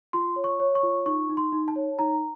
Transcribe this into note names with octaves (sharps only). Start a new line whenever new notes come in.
F4 C6
C#5
C#6
C#5
C#6
F4
D#4 C#6
D#4
C6
D#4
A5
C#5
D#4 A#5